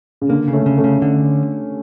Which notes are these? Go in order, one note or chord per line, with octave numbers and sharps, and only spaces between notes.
C#3
D3 A#3
C#3
A3 C#4
C#3
A3 C#4
C#3
D3